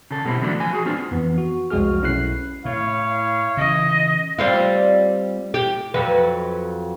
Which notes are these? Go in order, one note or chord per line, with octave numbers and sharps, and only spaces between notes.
C#3 A4
B2 G3 C4 E4
D3 E3 F#3 A3 C4 D4
F3 G#5
F#4 G#4
B3 C4 D4 F4
F2 E3 B3
F#4
C2 F2 G#3 F#4 G#4 F6
B1 C#4 E4 F#6 C7
A2 E4 C#5 F5
C#3 E3 D#5
G3 C4 F4
G4
F2 F#3 B4